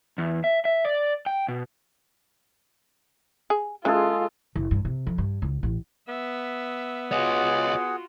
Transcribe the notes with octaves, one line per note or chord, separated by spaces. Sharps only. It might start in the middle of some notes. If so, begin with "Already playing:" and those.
E2
E5
E5
D5
G5
B2
G#4
C#3 E3 G#3 F4 G#4 A4
F#1
G2
C3
F2
G2
C#2
A1
B3 E5
F4 F#4 G#4 C#5 D#5 F#5